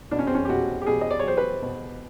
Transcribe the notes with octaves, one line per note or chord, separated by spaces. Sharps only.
B2 D4
C#4
C4
C#4
G4
B2 F#4
G4
B2 G#4
D#5
D5
C#5
F#3 C5
B4
B2